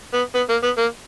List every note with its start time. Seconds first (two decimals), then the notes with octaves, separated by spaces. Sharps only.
0.14 B3
0.35 B3
0.50 A#3
0.63 B3
0.78 A#3